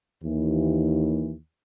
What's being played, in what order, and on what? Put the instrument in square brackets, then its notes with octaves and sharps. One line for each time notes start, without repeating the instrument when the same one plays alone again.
[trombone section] D#2 E3